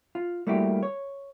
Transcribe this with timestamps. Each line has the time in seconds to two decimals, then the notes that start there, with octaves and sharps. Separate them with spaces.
0.15 F4
0.47 G3 A3 A#3 E4 F#4 G4
0.83 C#5